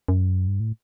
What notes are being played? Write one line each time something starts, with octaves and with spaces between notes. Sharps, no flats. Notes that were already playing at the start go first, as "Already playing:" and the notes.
F#2
G2
A2